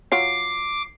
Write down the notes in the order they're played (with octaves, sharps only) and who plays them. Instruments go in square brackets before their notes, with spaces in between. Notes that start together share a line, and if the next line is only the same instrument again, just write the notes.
[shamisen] F#3 F4 C#5 [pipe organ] D6 [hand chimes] C7